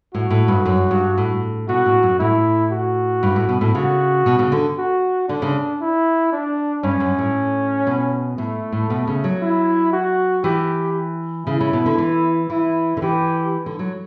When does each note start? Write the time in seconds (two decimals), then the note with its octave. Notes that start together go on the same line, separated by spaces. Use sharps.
0.14 A2 F#4
0.30 A2
0.48 G2
0.65 F#2
0.91 G2
1.18 A2
1.69 B2 F#4
1.86 A2
2.03 F#2
2.19 A2 E4
2.71 F#4
3.23 G2
3.36 A2
3.49 B2
3.61 A2
3.75 C#3 F#4
4.26 B2
4.39 C#3
4.52 D3
4.78 F#4
5.28 D3 D4
5.42 C#3
5.81 E4
6.32 D4
6.83 G2 C#4
7.00 F#2
7.19 A2
7.87 B2
8.38 A2 A3
8.72 A2
8.90 B2
9.07 C#3
9.24 F#3
9.42 E4
9.93 F#4
10.44 E3 G4
11.47 C#3 E4
11.60 C#3
11.73 B2
11.86 D3
11.98 E3
12.50 E3 E4
12.97 D3
13.02 E3 G4
13.66 D3
13.79 F#3